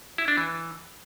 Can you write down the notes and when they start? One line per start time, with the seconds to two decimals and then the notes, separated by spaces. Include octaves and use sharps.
0.18 E4
0.28 D4
0.37 E3